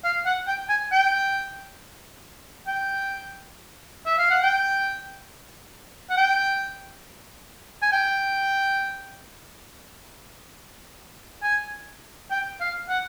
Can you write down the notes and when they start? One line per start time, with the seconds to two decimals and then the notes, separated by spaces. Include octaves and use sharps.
0.04 F5
0.26 F#5
0.47 G5
0.69 G#5
0.92 G5
2.67 G5
4.06 E5
4.18 F5
4.30 F#5
4.42 G5
6.10 F#5
6.17 G5
7.82 G#5
7.92 G5
11.43 G#5
12.31 G5
12.60 F5
12.89 F#5